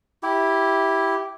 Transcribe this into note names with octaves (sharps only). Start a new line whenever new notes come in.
E4 G4